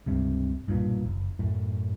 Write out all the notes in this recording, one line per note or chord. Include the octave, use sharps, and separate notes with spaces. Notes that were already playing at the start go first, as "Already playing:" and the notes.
C#2 G2 C3
B1 G2 A#2
F#1
F#2 A2